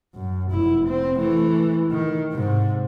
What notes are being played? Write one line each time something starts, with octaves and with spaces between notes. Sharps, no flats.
F#2
F1 E4
C4
E3 A3
D#3
G#2 C3